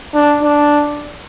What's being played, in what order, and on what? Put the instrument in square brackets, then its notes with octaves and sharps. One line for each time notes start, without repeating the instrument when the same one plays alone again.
[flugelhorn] D4
D4